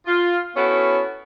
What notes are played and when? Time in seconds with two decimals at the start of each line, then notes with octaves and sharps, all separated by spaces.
0.07 F4
0.56 B3 C#4 E4 F#4 A4